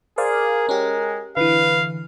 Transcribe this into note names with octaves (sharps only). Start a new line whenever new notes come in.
G#4 A#4 C5 D5 F5
G#3 C#4 G4
D3 E3 B4 F5